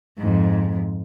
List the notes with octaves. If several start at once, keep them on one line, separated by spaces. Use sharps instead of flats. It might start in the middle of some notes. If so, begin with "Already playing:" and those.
F2 G#2